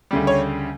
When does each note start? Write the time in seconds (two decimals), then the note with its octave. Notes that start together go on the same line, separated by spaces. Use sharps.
0.11 D2 C#3 G3
0.27 C#5